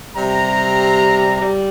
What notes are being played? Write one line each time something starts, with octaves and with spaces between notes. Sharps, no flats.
C3 G3 A#5
G3